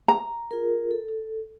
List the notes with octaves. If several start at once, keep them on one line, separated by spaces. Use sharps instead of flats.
A#5
F4 G#4 A#4
A4